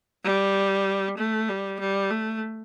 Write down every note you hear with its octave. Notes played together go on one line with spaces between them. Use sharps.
G3
A3
G3
G3
A3